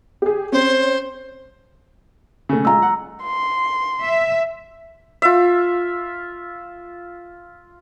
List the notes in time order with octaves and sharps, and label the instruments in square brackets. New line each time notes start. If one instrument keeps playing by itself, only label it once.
[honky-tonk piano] G4 G#4
[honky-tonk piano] C4 C#4 [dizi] C5
[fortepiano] C#3 A3
[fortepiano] G#3 F4 [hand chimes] A#5 E6
[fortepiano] F#5
[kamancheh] C6
[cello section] E5
[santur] F4 E5